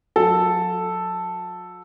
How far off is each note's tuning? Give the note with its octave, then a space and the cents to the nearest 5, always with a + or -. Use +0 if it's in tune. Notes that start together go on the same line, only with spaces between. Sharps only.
F#3 -45 A4 +0